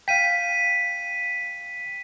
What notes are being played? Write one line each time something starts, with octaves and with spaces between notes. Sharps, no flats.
F5 G5 B6 D#7